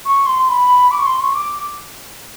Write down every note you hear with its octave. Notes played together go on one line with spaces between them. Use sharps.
C#6
C6
B5
D6
C#6
C6
C#6
D6